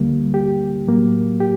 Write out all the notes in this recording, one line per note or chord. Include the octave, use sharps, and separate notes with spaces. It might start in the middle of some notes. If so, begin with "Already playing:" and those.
Already playing: D2 D3 G3 A#3
G4
A2 F#3 A#3
G4